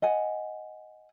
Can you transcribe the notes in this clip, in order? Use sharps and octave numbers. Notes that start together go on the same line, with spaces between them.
D#5 F#5 G#5